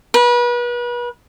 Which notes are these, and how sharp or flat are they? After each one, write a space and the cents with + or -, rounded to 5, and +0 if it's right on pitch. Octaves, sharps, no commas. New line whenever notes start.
B4 -35